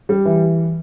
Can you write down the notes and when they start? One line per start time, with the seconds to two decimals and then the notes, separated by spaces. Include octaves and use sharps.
0.09 G3
0.25 E3